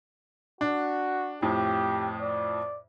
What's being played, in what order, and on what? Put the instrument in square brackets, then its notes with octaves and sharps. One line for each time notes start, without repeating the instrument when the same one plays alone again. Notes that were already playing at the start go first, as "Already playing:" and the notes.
[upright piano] D4 [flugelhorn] F#4
[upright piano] F2 A2 [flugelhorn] G4
[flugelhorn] D5